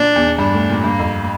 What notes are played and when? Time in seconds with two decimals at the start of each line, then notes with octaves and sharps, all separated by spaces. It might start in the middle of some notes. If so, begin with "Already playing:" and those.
Already playing: A#2 D4
0.16 E2
0.27 E2
0.38 G2 D4
0.54 A2
0.69 A#2
0.84 G2 A#3
0.99 F2